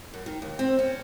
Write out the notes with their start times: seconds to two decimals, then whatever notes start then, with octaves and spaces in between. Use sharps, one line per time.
0.14 F#2
0.26 D#3
0.42 D#2
0.59 C4
0.79 C#4